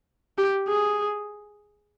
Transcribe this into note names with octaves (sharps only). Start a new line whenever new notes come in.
G4
G#4